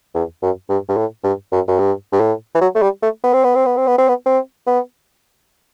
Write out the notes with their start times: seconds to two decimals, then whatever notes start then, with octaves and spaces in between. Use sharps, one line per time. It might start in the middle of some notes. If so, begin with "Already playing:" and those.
0.15 E2
0.42 F#2
0.70 G2
0.89 G2
0.97 A2
1.24 G2
1.52 F#2
1.68 F#2
1.79 G2
2.13 G2
2.20 A2
2.55 E3
2.61 F#3
2.75 A3
2.82 G3
3.03 A3
3.24 B3
3.34 C4
3.44 B3
3.55 C4
3.66 B3
3.77 C4
3.87 B3
3.98 C4
4.08 B3
4.26 C4
4.67 B3